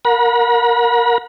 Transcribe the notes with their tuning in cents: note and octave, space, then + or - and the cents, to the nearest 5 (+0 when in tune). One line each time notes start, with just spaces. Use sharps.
A#4 +0 F#5 -35 B5 -45